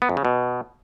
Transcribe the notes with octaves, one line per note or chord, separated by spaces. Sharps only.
B3
F2
C#3
B2